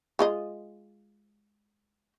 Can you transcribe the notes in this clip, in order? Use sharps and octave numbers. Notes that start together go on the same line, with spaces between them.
G#3 F4 D#5